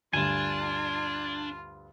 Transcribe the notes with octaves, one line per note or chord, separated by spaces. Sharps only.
D2 G2 D4 F4 G#5